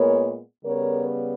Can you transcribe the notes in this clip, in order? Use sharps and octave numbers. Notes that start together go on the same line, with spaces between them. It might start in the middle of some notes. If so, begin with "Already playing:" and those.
Already playing: A#2 G#3 B3 A#4 C#5
C#3 G3 B3 A#4 C#5